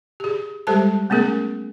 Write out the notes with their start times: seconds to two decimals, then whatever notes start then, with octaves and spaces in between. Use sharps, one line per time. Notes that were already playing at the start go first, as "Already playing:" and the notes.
0.20 G4 G#4
0.67 G3 G#3 G4 A4 C5 A5
1.10 A3 B3 C#4 G#4 A#4